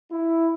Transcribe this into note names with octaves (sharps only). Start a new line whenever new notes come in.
E4